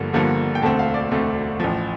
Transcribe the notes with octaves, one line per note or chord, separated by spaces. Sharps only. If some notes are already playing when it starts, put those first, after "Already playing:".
Already playing: G1 G2 D3 F3 A#3
G1 G2 D3 F3 A#3
G5
E1 D2 D3 A3 C4 A5
F5
D5
E1 D2 D3 A3 C4
A1 A2 F3